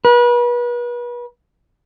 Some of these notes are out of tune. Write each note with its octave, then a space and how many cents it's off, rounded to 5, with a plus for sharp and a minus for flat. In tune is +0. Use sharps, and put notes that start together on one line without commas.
B4 -35